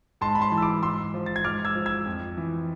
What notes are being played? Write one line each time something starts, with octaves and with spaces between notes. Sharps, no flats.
G#2 A5 C6
B5
A5 C6
E3
E6
B5 D6
G#2 C6 E6
F3
A6
G#6
G#2 D6 F6
E6 G#6
F3
E6 G#6
F2
E3